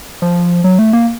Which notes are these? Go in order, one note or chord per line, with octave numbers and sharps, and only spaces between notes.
F3
F#3
A3
A#3